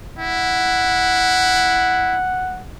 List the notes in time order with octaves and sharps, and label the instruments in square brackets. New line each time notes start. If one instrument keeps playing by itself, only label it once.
[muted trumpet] E4 [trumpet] F#5